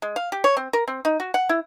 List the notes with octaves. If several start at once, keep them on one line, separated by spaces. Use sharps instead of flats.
G#3
F5
G4
C#5
C4
A#4
C4
D#4
F#4
F#5
E4